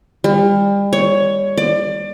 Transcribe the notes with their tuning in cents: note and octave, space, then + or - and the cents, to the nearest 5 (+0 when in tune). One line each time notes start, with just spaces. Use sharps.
G3 +35
C#5 +10
D5 +25